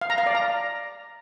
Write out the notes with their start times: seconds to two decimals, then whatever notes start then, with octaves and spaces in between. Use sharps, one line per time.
0.01 F5
0.10 A#5
0.18 F5
0.26 D5
0.35 A#5